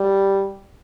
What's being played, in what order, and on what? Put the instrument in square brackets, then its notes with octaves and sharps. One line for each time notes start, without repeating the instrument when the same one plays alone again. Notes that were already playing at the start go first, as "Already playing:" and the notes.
Already playing: [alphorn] G3